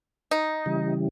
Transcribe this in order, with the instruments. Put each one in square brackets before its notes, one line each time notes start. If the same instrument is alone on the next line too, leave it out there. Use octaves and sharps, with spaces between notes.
[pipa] D#4
[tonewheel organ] C#3 E3 G3